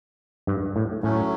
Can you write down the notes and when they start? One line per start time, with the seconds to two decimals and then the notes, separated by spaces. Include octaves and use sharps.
0.47 G2
0.76 A2
1.03 A2 F#3 A3 C#4